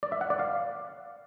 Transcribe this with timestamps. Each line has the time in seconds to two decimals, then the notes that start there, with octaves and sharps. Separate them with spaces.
0.03 D5
0.12 E5
0.21 F#5
0.30 D5
0.39 F5